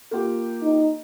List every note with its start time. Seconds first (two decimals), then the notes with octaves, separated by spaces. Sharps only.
0.11 A#3 F4 G4
0.62 D#4